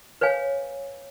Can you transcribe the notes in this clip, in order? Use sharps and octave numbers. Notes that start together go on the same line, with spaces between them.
B4 C#5 F5 G#5